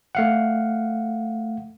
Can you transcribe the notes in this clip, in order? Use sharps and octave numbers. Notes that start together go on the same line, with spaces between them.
A3 F5 F#5